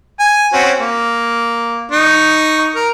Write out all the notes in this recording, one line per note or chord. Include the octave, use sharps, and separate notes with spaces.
G#5
C4 C#4 F#4
A#3
D#4 C#6
A#4